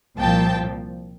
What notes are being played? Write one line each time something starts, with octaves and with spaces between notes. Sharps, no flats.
C2 A#2 F3 G5 A5